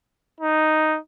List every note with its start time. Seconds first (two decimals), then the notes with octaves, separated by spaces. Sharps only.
0.40 D#4